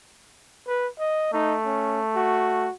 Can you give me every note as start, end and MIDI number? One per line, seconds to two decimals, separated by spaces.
0.68 0.88 71
0.99 1.33 75
1.34 2.68 57
1.34 1.56 63
1.65 2.01 61
2.15 2.73 66